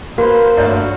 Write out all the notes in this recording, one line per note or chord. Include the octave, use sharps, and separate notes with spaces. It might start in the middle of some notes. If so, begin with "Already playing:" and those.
A#3 F#4 B4 C5
G2 A3 F#4 C#5 D5 F5 A#5